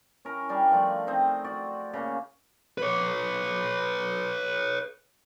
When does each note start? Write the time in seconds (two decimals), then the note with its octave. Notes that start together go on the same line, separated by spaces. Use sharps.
0.25 C#4 E4 A#4
0.49 G3 D4 F5
0.72 F3 A3 D4
1.07 C4 D#4
1.44 F#4 D5
1.93 C#3 A#3 F#4
2.78 B4 C#5